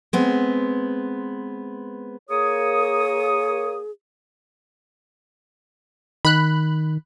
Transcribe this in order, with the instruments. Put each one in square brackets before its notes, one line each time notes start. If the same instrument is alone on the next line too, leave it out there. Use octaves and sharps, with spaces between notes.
[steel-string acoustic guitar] G#3 B3 C4
[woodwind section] A#3 C#5 D#6 [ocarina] G#4
[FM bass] D#3 [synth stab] B5 F#6